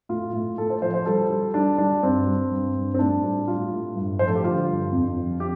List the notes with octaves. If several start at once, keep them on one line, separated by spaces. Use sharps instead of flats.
A2 F4
A2
A2 A4
C5
F3 C5
C5
G3 A4
G3
G3 D4
G3 D4
G2 C4
G3
G2
G2
C4
A2 D4
G3
G3 F4
A2
G2
F3 C5
A4
G4
D3 F4
G2
F2
F3
G4